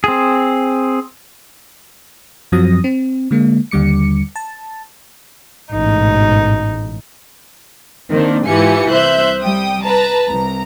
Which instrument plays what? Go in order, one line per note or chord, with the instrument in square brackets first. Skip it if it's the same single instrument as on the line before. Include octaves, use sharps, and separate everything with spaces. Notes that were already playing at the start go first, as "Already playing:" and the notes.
[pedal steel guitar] C4 G#4
[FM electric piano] F#2 F3 F#3 C4 D#6 A#6
C4
D3 G#3 A#3
D#2 D3 G3 D6 C#7
A5
[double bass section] A1 G#2 B2 [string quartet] D#4
[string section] D#3 A#3 C4 D4
G#2 E3 F4 G4 G#5 C#7
C2 C5 E5 F#6 G6
G3 G5 D#6
B4 A5 A#5
C2 A#5